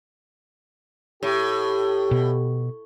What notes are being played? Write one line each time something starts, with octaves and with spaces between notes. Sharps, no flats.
A2 G4
B2